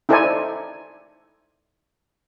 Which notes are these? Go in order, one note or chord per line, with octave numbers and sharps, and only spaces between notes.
D#4 E4 A4 C5 D5 G#5